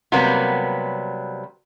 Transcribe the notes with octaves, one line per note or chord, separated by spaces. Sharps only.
C3 F#3 G3 A#3 B3